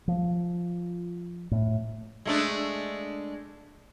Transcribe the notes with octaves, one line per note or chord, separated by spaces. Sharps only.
F3
A2
G#3 A3 D4